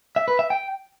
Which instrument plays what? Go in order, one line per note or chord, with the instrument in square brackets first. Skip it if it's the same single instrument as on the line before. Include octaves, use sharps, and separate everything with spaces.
[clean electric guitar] E5
B4
E5
G5